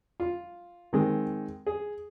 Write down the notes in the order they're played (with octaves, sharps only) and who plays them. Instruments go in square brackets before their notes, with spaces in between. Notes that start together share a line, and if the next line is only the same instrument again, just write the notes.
[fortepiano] F4
D#3 G#3 C4
G#4